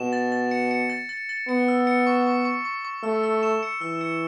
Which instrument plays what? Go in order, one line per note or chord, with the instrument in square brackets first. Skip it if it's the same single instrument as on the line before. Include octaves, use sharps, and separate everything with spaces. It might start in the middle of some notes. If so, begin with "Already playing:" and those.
Already playing: [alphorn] B2 [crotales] E7
[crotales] A6
A6
C#7
C#7
A6
A6
A6
[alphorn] B3 [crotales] C#7
[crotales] E6
C#7
C#6
C#6
C#6
C#6
C#6
[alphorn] A3 [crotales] E6
[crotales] E6
E7
C#7
[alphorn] E3 [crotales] E6
[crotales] C#7